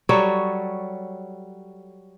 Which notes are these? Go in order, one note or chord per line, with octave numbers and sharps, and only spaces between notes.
F#3 G3 A4 C#5